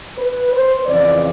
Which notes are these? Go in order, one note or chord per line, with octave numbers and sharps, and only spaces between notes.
B4
C5
F2 C#3 E3 D5